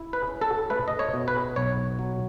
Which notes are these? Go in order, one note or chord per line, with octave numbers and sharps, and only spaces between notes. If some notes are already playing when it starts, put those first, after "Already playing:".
Already playing: E4
B4
C#4
A4
A3 B4
D#5
C#5
B2
B4
B1 C#5
F#3